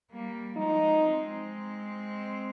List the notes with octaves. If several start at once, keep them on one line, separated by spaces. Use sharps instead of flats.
G3 A#3
F3 G#3 D#4
G#3 C4